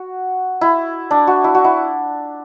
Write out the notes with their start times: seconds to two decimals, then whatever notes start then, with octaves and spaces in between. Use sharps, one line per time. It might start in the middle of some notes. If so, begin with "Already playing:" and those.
Already playing: F#4
0.61 E4
1.11 D4
1.27 F#4
1.44 E4
1.55 F#4
1.64 E4